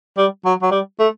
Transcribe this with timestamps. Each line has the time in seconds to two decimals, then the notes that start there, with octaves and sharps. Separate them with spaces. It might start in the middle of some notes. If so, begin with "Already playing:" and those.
0.18 G3
0.45 F#3
0.62 F#3
0.71 G3
0.99 A3